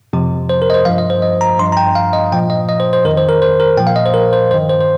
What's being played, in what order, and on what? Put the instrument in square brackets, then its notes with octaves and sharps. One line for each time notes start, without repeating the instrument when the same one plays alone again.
[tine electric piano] F2 C3 F3
C5
A#4
D#5
C5
G2 F3 F5
D#5
C5
D#5
A#5
G2 F3 C6
A#5
G5
F5
D#5
A#2 F3 G5
D#5
D#5
C5
C5
F2 D#3 A#4
C5
A#4
C5
A#4
A#2 F3 G5
F5
D#5
C5
A#4
C5
G2 D#3 C5
C5
C5